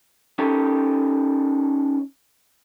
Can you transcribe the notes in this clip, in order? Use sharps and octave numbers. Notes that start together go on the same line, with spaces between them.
C#4 D#4 G4 A4 A#4